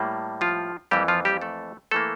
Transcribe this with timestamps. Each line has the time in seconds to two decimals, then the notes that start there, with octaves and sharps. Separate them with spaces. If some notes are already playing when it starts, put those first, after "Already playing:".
Already playing: A2 G3 A#3
0.41 F3 F4
0.91 F2 E3 G3 A#3 G4
1.08 F3 F4
1.25 G3 G4
1.41 A3 A4
1.91 E3 A3 A#3 A4